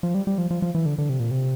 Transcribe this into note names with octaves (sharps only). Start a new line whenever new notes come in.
F3
G3
G3
F3
F3
F3
E3
D3
D3
C3
A#2
C3